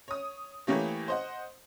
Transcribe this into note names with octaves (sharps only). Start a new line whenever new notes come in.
C#5 D#6
E3 A3 A#3 G4 C#5
C5 D#5 F#5